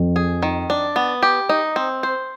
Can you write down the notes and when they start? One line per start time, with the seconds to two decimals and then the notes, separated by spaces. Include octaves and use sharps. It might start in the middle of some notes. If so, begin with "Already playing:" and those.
Already playing: F2
0.16 G#4
0.43 D#3
0.70 D4
0.96 B3
1.23 G4
1.49 D#4
1.76 C4
2.03 C5